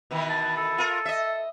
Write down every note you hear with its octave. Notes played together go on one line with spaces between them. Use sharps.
B2 D#3 E3
A5
A4
F4 A#4
D#5 E5